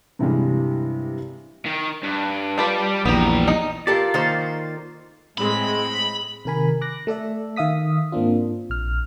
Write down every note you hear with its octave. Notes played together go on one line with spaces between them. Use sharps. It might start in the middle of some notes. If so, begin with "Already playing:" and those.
G2 C3 E3 G3 G#3
D#3
G2
G3 D4 F4 B4 D5
A#1 E2 G3 B3 G4 A#5
D#4
F4 G4 A4 A#4 D5
D#3 A#3 C5
A2 G#3 C4 B5
C3 D#3 A#4 G#5 B5
D6 F#6 A#6
A3 A4 D5 E5
D#3 E5 F5 D#6 B6
G#2 A#3 C4 D4 F4
A#1 F6